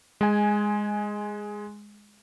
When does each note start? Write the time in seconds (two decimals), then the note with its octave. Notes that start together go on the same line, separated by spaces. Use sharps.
0.21 G#3 G#5